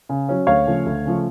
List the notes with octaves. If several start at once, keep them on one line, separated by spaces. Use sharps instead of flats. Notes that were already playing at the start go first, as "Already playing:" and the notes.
C#3
F#3 C#4
D2 C#5 F5
C#3 F3 A3
D2
C#3 F3 A3